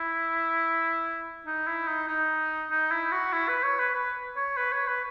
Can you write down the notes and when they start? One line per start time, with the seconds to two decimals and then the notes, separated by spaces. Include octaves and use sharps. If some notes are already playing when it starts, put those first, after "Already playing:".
Already playing: E4
1.46 D#4
1.67 E4
1.88 D#4
2.08 D#4
2.71 D#4
2.91 E4
3.12 F#4
3.33 E4
3.49 B4
3.64 C#5
3.79 B4
3.95 B4
4.36 C#5
4.57 B4
4.72 C#5
4.88 B4